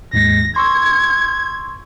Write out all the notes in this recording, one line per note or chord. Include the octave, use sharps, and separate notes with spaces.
D#2 G#2 G#3 A#6
C6 C#6 E6 G#6